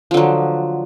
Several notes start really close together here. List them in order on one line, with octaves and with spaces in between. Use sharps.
F3 D3 F#3